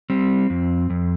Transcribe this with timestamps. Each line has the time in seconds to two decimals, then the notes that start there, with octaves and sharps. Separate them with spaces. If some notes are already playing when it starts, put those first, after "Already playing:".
0.10 G3 C4
0.50 F2
0.90 F2